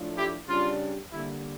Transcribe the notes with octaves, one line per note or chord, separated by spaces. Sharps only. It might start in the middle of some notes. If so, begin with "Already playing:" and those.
Already playing: A2 F3 A3 D4
E4 G4
C#3 G3 D4 F4
D3 G3 A#3 E4